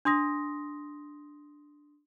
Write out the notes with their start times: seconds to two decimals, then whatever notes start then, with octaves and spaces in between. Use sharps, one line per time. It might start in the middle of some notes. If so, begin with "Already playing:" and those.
0.05 D4 C6 D#6 A#6